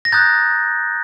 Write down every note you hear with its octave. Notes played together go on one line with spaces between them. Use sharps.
A#6
A#5 D#6 F#6 G6 A6